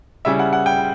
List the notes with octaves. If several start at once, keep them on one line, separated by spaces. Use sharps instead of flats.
C#3 G3 C#4 E4 E5
F#5
F#5
G5